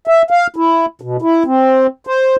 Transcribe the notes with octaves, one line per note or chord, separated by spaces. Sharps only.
E5
F5
E4
B2
E4
C4
C5